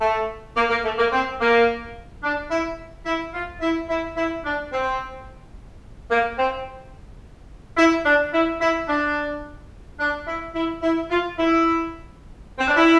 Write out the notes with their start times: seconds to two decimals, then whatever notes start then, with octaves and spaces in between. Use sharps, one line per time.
0.01 A3
0.57 A#3
0.70 A#3
0.85 A3
0.98 A#3
1.12 C4
1.40 A#3
2.23 D4
2.51 E4
3.06 E4
3.34 F4
3.61 E4
3.89 E4
4.16 E4
4.45 D4
4.73 C4
6.11 A#3
6.38 C4
7.77 E4
8.05 D4
8.33 E4
8.61 E4
8.89 D4
9.99 D4
10.27 E4
10.55 E4
10.83 E4
11.11 F4
11.38 E4
12.58 C4
12.67 D4
12.76 E4